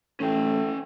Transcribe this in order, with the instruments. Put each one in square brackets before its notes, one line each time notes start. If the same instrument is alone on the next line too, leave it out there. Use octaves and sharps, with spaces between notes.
[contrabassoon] A1 [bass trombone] A3 [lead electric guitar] C#4 G5